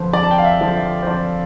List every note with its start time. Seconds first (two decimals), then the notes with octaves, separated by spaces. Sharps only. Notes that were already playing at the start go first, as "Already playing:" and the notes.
Already playing: F2 D3 F3 B4 C5
0.13 F2 D5
0.23 A5
0.31 G5
0.38 F5
0.44 E5
0.61 D3 F3
0.77 E5
1.02 C5
1.07 F2 D5